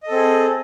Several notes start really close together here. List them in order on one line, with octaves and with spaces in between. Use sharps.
D#5 A4 C4 G#4